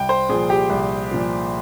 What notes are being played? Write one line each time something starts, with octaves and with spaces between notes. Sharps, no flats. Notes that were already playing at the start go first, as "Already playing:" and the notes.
Already playing: C2 G5
C5
A#2 F3 G#4
G4
C2
A#2 F3